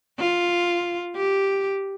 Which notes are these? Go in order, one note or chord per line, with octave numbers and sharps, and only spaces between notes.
F4
G4